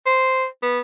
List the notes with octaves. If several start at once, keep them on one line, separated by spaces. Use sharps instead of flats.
C5
B3